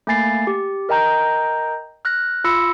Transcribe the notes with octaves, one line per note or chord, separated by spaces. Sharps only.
A3 A#3 G#5 A6 C7
G4
A#4 D#5 G5 A#5 G6
F6 F#6 A#6
F4 B5 E6 A#6 C#7